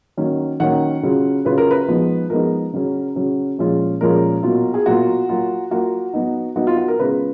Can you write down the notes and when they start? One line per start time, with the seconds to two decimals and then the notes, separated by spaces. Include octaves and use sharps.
0.17 D#3 F#3 A#3 C#4
0.60 D#3 F#3 A#3 C#4 F#5
1.03 C#3 F#3 C#4 F4
1.45 C#3 F#3 C#4 F4 B4
1.58 A#4
1.71 B4
1.88 F3 G#3 B3 D#4
2.30 F3 G#3 B3 D#4 A#4
2.73 C#3 F#3 C#4
3.16 C#3 F#3 C#4
3.58 A#2 F3 G#3 C#4 F4
4.01 A#2 F3 G#3 C#4 F4 A#4
4.43 B2 F#3 A#3 F4
4.74 G#4
4.86 B2 F#3 A#3 F4 F#4
5.29 F#3 A#3 F4
5.71 F#3 A#3 F4 F#4
6.13 F#3 B3 D#4
6.56 F#3 B3 D#4 F#4
6.67 F4
6.77 F#4
6.88 A#4
6.99 C#3 G#3 B3 F4 B4